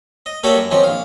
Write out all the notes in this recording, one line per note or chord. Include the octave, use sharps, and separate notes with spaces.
D#5
A#3 F#4 G4 A4 C#5 D5
F#2
D#3 F3 F#3 C4 C#4
A#1 F5